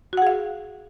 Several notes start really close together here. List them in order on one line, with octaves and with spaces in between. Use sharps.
F#4 F#5 G#4 F5